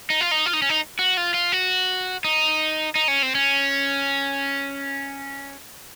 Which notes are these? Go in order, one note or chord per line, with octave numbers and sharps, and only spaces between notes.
D#4
F4
D#4
F4
D#4
C#4
D#4
F#4
F4
F4
F#4
D#4
D#4
C#4
C4
C#4